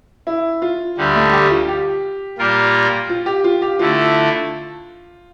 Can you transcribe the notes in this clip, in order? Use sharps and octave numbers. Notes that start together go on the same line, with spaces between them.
E4
F4
D2 D3 G3
A3
G4
F4
G4
A#2 G3 A#3 F4 A#4
F4
G4
F4
G4
D3 A3 E4 F4